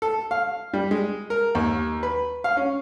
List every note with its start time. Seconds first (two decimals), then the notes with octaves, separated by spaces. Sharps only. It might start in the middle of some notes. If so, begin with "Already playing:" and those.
0.02 A4
0.31 F5
0.74 G3
0.91 G#3
1.30 A#4
1.55 D#2
2.03 B4
2.44 F5
2.57 C#4